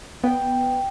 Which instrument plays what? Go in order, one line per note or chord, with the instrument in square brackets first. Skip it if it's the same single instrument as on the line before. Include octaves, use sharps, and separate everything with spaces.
[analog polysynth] B3 [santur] G5